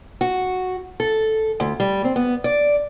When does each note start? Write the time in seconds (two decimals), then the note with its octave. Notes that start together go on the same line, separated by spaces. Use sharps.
0.21 F#4
1.00 A4
1.60 D2
1.80 G3
2.04 C4
2.16 B3
2.44 D5